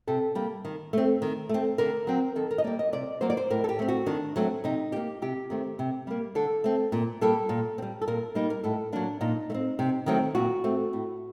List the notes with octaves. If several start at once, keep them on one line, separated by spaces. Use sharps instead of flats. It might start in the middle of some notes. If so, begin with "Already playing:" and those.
C3 A4
G3 A#3
D#3
A3 C4
D#3
A3 C4
D3 A#4
F#3 C4
D#3 A4
A#4
D#5
G3 A#3 D5
D#5
C3 D5
F#3 A#3 C5
D5
C5
A2 A#4
A4
G4
A3 C4
F#4
D#3 D4
F#3 A3 C4
C3 D#4
G3 A#3 G4
C3 G4
D#3 A3 C4
C3
G3 A#3
D3 A4
A3 C4
A#2
G3 A#3 A4
A#2
C4
G3
A4
A#2 A#4
G3 A#3 D#4
A#4
A2 A4
F#3 A#3 D4
A#2 D#4
A3
C4
C3
D#3 F#3 A3 C4
A#2 F#4
A3 C4
A2